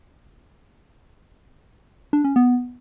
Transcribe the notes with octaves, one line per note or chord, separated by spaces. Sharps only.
D4
C#4
B3